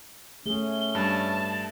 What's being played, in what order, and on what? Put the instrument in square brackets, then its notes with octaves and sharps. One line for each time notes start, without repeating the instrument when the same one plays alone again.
[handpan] A3 G#4 [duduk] C#4 [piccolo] G7
[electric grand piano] G2 [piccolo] A5